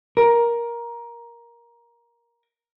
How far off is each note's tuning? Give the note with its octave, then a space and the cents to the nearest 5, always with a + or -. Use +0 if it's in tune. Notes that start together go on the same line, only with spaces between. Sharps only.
A#4 +15